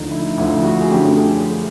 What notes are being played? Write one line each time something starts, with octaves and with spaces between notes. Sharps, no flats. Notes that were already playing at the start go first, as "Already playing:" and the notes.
Already playing: D2 D3 F3 D#4
E4
D2 D3 F3 E4
F#4
G#4
F#2 D3 F3 A3 G4
G#4